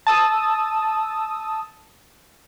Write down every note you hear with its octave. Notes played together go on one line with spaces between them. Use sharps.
A5 D#6 E6